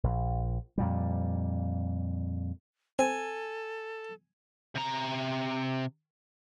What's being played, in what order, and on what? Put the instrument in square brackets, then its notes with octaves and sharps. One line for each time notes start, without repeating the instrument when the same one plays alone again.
[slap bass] A#1
F2 A#2 G3
[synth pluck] C4 [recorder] A4 [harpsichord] G#5
[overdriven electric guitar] C3 A#5